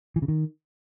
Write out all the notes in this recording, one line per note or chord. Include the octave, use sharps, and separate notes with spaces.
E3
C#3
D#3